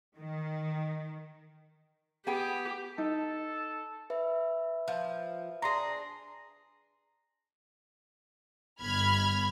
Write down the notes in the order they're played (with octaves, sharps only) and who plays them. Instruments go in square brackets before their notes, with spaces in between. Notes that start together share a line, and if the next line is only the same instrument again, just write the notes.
[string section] D#3
[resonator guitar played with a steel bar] B3 G#4 G5 [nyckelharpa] G4
[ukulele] D#4 [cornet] A4
[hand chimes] B4 E5
[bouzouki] F3
[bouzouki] D4 G#4 [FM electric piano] A#5 C6 A#6
[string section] G1 B5 F6 G#6